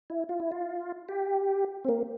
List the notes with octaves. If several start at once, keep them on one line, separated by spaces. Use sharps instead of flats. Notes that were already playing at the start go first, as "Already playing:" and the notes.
E4
F4
E4
F4
G4
C4
A#3